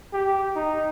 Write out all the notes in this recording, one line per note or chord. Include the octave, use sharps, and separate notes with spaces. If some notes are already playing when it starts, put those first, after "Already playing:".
G4
D#4